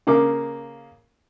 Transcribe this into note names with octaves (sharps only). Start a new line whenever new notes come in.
C#3 A#3 D6